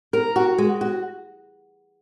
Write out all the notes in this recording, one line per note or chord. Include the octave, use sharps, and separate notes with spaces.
A#4
F#4
G#3
F#4